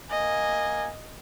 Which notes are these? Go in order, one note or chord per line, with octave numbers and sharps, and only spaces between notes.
A#3 D#5 G#5